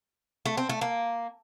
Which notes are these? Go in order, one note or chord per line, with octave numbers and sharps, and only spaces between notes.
A3
C4
A3
A#3